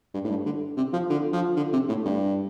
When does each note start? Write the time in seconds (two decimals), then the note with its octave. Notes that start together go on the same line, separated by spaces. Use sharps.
0.14 G2
0.24 A2
0.30 G2
0.46 D3
0.77 C3
0.93 F3
1.10 D3
1.33 F3
1.57 D3
1.73 C3
1.89 A2
2.06 G2